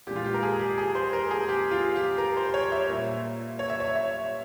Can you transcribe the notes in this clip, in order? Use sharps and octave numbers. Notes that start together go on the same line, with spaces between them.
A#2 G#3 G4
F4
G4
A#4
G#4
G4
G#4
C5
A#4
G#4
G4
F4
G4
A#4
C5
C#5
E5
A#2 G3 A#3
C#5
E5
C#5
E5